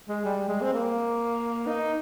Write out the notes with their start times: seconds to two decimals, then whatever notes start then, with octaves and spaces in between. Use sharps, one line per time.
0.09 G#3
0.25 G3
0.49 G#3
0.62 C4
0.73 A#3
1.67 D#4